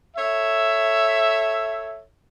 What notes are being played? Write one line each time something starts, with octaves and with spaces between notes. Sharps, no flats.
A4 C#5 E5